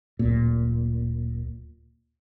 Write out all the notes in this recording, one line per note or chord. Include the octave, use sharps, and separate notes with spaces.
D1 A#2